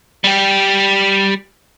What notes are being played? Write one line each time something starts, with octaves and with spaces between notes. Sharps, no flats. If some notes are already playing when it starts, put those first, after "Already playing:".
G3 G4